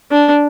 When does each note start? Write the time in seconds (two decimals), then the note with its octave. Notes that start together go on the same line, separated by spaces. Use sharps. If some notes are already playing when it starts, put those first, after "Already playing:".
0.11 D4